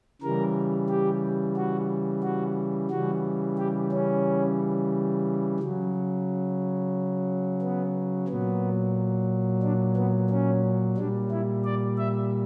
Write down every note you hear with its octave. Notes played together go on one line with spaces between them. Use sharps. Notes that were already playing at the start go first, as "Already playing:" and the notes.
C#3 E3 G3 A#4
G4
F#4
F#4
C#3 E3 G3 F#4
G4
C#4
C#3 F#3
B3
A#2 F#3 B3
D4
B3
C#4
A#2 G3 D4
E4
D5
E5